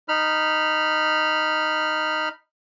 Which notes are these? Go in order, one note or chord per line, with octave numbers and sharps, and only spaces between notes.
D#4 B5 F6